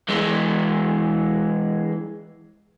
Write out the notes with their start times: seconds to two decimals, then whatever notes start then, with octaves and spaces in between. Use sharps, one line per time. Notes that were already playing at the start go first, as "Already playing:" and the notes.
0.09 E3 G#3